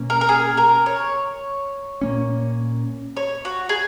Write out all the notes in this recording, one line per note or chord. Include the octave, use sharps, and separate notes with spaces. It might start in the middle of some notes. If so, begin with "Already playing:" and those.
Already playing: B2 A#3 C#4
A#4
A#4
G#4
A#4
C#5
A#2 A#3 C#4
C#5
F#4
G#4